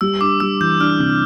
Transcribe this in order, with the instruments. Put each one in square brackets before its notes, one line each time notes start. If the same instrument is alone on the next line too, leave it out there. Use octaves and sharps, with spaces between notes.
[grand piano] G3 [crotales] E6
[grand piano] D4 [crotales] D6
[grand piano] G3 [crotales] E6
[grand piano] E3 [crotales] G6
[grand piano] D4 [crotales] F6
[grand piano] C3